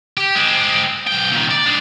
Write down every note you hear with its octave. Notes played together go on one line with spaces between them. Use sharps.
G4
G#3 C4
B1 G5
A#2 D#3
D5
G#3 D4